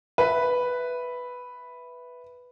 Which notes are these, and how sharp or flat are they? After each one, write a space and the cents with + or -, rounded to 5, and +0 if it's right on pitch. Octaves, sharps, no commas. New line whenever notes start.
B4 +0 E5 +0